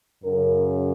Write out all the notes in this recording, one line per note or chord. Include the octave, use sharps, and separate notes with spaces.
F#2 C#3 A#4